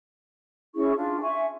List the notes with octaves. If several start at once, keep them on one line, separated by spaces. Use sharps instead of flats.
C#4 E4 G#4 C#6
D4 F4
E5 G#5 C#6